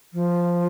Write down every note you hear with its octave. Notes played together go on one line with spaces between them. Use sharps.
F3